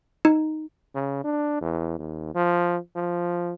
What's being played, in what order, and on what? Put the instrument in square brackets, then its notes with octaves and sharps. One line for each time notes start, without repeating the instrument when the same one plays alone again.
[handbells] D#4
[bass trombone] C#3
D4
E2
D#2
F3
F3